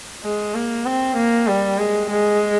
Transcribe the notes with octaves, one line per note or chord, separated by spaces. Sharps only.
G#3
A#3
C4
A#3
G3
G#3
G#3